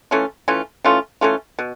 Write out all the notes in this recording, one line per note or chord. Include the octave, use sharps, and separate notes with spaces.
E3 A3 C#4 F4
E3 A3 C#4 F4
E3 A3 C#4 F4
E3 A3 C#4 F4
B2